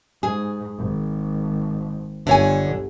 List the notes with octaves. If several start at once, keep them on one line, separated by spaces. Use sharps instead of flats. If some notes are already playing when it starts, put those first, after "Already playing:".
G#2 G#4
G#1
G1 D3 C#5 G#5